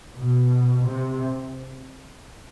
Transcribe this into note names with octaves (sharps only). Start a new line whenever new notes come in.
B2
C3